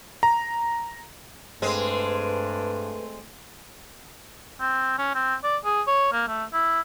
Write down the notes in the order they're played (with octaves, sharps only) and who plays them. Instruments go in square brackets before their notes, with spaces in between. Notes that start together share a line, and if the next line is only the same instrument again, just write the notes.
[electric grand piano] A#5
[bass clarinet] G2 [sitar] G#3 C4 [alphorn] A3 [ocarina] B4
[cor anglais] C4
C#4
C4
D5
G#4
C#5
A#3
A3
E4